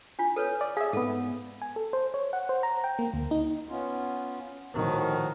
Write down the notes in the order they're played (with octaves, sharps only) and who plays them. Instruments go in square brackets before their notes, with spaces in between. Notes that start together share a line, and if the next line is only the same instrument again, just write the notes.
[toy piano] D4 F4
A4 B4 C#5
[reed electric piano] D5
[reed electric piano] G#4 E5 [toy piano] F5
[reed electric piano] G#2 B3 [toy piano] A4
[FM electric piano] G#5
A4
C5
C#5
F#5
C5
A#5
G5
A#3
D2
D#4
[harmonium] B3 C#4 F4
[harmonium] A2 F3 F#4 [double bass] D#3